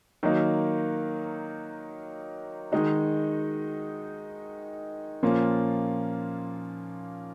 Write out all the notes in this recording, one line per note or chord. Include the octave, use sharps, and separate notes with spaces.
D#3 F#3 A#3 D#4
D#3 G#3 D#4 F#4
A#2 F3 A#3 C#4 F4